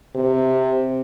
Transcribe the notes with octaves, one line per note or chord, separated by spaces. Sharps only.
C3